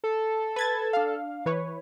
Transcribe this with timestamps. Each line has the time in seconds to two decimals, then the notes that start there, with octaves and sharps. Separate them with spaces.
0.04 A4
0.56 B4 G#6 A6
0.93 D4 F5
1.46 E3 B4 C#5